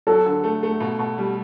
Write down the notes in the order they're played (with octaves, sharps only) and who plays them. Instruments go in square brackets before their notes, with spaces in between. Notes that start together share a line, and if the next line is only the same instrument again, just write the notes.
[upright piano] F#3 [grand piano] A4
[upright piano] D3
A3
A3
B2
B2
G3